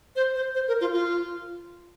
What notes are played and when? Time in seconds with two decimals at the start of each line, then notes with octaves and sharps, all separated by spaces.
0.16 C5
0.35 C5
0.55 C5
0.68 A#4
0.81 F4
0.93 F4